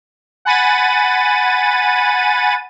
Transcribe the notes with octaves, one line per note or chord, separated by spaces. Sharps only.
F#5 G#5 B5 A6 D#7